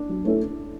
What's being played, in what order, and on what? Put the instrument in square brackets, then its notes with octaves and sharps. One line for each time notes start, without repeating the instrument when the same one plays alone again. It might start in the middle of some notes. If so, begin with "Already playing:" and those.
Already playing: [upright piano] D4
[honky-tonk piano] F#3
A3 C#4 E4 A4